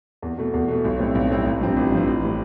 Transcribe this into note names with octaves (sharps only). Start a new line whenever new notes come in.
E2
B2 A3
E2
B2 A3
B1
A2 G3 C4 E4
B1
A2 G3 C4 E4
A1
G2 F3 C4
A1
G2 F3 C4
A1
A2 E3 G3